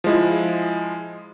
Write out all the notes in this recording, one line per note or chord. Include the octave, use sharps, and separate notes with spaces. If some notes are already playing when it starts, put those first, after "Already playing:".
F3 G#3 E4